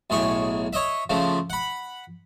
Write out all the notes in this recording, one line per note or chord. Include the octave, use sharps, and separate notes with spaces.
B1 A2 G#4 C#6
C#5 D#5 E5
C#3 F3 A3
F#5 B5